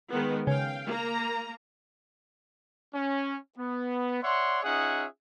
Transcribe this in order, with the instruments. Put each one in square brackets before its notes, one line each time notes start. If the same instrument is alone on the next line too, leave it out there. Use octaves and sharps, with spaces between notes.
[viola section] D#3 G#3 B3
[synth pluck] C#3 [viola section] F5 G5
[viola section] A#3 A#5
[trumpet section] C#4
B3
C#5 D5 E5 F#5 C6
C#4 D#4 F4 G#4 E5 F#5